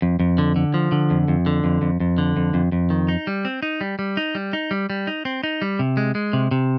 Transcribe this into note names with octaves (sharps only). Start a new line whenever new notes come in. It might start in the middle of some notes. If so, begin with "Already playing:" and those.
F2
F2
D3
D3
F3
D3
F2
F2
D3
F2
F2
F2
D3
F2
F2
F2
D#3
D#4
G3
C4
D#4
G3
G3
D#4
G3
D#4
G3
G3
D#4
C4
D#4
G3
C3
G#3
G#3
C3
C3